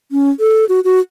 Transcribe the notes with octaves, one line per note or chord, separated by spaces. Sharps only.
C#4
A4
F#4
F#4